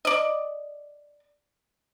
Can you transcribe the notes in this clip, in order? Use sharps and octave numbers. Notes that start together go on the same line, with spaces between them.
D5 D#5